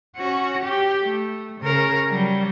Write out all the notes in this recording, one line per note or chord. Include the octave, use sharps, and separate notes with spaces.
C#4 F#4
G4
A3
C#3 A#4
F#3 G3